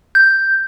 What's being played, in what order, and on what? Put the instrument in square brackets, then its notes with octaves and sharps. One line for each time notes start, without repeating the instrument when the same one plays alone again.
[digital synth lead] G6